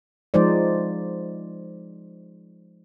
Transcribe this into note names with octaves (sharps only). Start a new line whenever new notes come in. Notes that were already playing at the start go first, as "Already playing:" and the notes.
F3 G#3 D#4 C5 D5